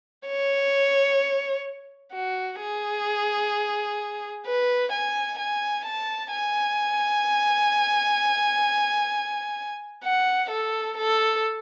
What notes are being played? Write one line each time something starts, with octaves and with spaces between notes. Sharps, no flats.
C#5
F#4
G#4
B4
G#5
G#5
A5
G#5
F#5
A4
A4